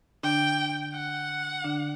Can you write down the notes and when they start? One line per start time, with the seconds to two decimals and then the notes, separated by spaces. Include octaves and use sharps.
0.23 D3 D4 G5
0.95 F#5
1.65 D3 D4